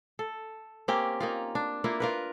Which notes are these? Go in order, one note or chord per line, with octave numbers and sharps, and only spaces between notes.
A4
A#3 C4 C#4 G4
A#3 D#4 F4
D4
A#3 E4 F4
F4 A#4 B4